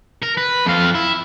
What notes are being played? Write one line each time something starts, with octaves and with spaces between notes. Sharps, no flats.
A#4
B4
F2 F5
E4